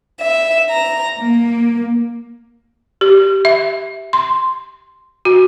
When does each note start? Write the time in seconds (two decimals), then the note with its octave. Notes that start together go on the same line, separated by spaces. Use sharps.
0.20 E5
0.69 A#5
1.18 A#3
3.01 G4
3.45 E5
4.13 C6
5.25 F#4